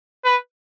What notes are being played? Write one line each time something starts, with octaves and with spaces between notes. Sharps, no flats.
B4